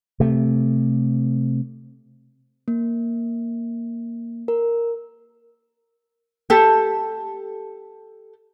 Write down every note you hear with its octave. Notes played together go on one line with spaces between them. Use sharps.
C3 A3
A#3
A#4
G4 A4